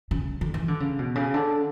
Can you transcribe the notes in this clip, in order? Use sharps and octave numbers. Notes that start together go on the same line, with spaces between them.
C#3
D3
E3
D3
C#3
B2
C#3
D3